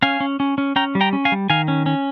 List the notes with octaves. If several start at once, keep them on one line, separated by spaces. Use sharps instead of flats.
C#4 F5 G#5
C#4
C#4
C#4
C#4 G5 A#5
G3
G5 A#5
C#4
F5 G#5
G3
D#3 F5 G#5
C#4
C#4